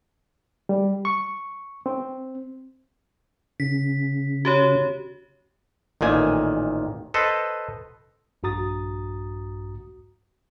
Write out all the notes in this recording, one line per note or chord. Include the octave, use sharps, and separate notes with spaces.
G3
C#6
C4
C#3 B6
F#4 G4 C#5
A1 A#2 D#3 G#5
A4 B4 C5 D#5
A#1 G2 F#4 A#5 D#6 A6